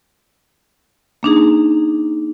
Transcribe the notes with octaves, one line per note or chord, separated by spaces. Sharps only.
A#3 D4 D#4 G#4